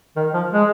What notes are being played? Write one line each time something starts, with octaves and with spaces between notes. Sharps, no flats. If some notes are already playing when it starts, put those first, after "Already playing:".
D#3
F3
G#3